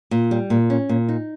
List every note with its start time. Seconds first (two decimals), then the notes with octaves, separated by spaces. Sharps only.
0.11 A#2
0.31 G3
0.50 A#2
0.70 C#4
0.89 A#2
1.09 D#4